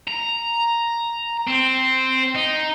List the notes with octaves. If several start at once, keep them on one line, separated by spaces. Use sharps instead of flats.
A#5
C4
D#4